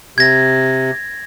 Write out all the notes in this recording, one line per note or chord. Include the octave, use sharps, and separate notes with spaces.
C3 G#6 A#6